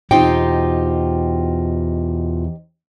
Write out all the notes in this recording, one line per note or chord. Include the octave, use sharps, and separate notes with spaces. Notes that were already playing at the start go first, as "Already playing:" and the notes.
E2 B2 C4 D#4 F4 G4 G5